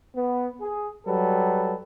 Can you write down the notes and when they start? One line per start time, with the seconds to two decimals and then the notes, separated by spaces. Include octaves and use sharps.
0.15 B3
0.61 G#4
1.06 F#3 G3 A4 B4